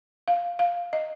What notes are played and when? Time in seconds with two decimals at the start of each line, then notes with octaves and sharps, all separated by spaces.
0.28 F5
0.59 F5
0.93 D#5